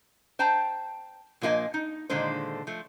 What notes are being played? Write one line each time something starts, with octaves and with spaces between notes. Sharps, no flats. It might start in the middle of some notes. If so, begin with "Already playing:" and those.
C5 G5 A5 A#5
A#2 F3 A#3 E4 D#5 G#5
D#4
A#2 D3 D#3 G#3 A4 C5
F3 A3